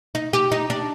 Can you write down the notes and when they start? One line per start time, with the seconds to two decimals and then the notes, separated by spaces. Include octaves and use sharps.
0.15 D#4
0.33 G4
0.52 D#4
0.70 D4